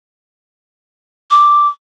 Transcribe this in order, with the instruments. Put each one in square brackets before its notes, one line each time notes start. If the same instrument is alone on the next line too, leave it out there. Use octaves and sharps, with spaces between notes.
[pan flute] D6